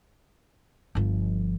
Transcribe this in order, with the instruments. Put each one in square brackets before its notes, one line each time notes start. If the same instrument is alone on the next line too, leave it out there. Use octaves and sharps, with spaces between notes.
[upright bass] G1 F3